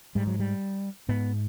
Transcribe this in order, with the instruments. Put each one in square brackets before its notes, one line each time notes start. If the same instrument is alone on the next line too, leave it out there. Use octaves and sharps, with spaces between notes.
[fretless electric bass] G#2 G3
F#3
G3
G#2 B3